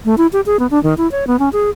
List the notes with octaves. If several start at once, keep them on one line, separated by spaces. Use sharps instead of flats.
A3
E4
G4
G#4
B3
D4
D#3
E4
C#5
B3
C#4
G#4